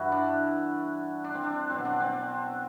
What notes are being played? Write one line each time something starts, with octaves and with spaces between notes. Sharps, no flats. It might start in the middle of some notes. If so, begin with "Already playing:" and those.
Already playing: G2 E3 E4 F#4
D4
D4
C4
D4
B2 F#3 C4
D4
C4